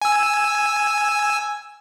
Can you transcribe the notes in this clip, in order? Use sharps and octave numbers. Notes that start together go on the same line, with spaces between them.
G#5 E6